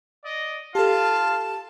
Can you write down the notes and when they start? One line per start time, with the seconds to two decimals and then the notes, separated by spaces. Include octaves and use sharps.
0.25 D5 D#5
0.75 F4 G4 A4 F5 A5